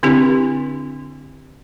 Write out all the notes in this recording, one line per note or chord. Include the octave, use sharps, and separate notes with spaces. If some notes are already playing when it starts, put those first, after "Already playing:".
D3 C4 D4 E4 G4